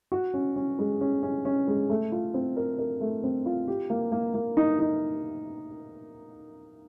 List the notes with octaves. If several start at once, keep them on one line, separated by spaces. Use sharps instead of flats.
F#4
C#4
C#4
G#3
C#4
C#4
C#4
G#3
A3
F4
C4
A#4
A#4
A3
C4
F4
G4
A#3
A#3
A#3
D#4
D#4